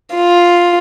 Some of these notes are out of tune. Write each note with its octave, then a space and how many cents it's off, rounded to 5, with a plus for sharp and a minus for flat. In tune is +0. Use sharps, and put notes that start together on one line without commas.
F4 +5